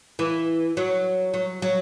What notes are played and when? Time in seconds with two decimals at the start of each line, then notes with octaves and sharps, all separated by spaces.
0.19 E3
0.77 F#3
1.34 F#3
1.62 F#3